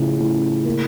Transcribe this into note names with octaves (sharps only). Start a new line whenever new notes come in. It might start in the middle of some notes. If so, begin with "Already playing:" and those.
Already playing: A2 C#3 F3
A2
A#3